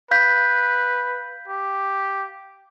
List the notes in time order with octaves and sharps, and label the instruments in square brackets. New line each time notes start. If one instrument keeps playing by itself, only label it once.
[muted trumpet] B4 [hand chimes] F5 G6 B6
[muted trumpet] G4